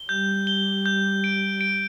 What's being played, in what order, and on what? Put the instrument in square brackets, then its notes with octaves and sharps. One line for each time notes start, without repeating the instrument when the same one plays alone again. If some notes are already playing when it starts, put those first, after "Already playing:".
Already playing: [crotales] G7
[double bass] G3 [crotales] G6
[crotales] G7
G6
D7
D7